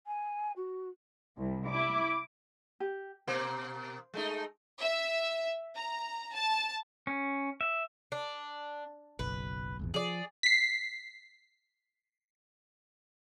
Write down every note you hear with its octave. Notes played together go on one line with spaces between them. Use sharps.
G#5
F#4
C2
E4 D6
G4
B2 A#3 C5
G#3 A3 D#4
E5
A#5
A5
C#4
E5
D4
F#1 B1 B4
D#1 G#1 E2
F3 G#4 D5
B6 C7